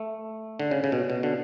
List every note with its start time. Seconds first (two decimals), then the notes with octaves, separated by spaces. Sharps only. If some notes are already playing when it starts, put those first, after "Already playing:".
Already playing: A3
0.60 D3
0.71 C#3
0.84 C#3
0.92 B2
1.10 B2
1.23 D3